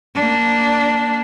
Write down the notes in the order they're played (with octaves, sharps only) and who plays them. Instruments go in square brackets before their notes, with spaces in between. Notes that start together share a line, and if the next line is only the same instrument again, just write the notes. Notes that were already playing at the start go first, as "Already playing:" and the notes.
[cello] A#3 D4